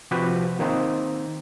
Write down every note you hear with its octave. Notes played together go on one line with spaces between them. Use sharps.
C3 F3 F#4 G4 B4
D#3 A#3 C4 D#4